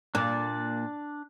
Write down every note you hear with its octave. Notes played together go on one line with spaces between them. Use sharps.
A#2 A#3 D4 D5